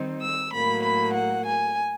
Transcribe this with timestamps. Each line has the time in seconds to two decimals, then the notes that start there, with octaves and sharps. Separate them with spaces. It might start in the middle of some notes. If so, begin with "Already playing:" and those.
Already playing: D#3 G3 C4 D#4
0.23 E6
0.53 A2 F#3 A#3 B5
0.84 B5
1.15 F#5
1.47 G#5